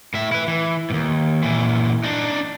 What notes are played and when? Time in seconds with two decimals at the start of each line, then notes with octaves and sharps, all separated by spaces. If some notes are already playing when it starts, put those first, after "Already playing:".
0.14 A2 E5
0.32 E4 B4
0.48 E3
0.90 D#2 G#2
1.43 A#2 E3
2.03 D4 D#4